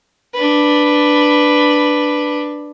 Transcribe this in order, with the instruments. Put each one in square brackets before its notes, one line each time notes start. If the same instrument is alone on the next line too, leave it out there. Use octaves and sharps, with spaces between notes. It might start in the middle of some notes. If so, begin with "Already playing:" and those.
[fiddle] D4 B4